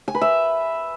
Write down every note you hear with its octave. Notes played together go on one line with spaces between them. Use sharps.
G#5
B4
E5